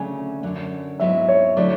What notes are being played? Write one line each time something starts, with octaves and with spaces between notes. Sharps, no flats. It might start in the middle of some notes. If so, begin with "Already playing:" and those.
Already playing: D2 C#3 F#3 A3 G#5
F#2 D3 F#3
G#2 F#3 B3 E4 E5
C#5
D3 F#3 A3 E4 D5